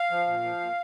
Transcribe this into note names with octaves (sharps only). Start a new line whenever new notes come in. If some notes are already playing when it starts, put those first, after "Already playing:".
Already playing: F5
F3
A#2
F3
A#2